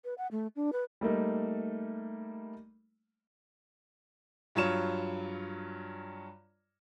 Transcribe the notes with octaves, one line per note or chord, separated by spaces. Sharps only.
B4
F#5
A3
D4
B4
G3 A3 A#3 D#4
G2 F#3 F4 C#5 E7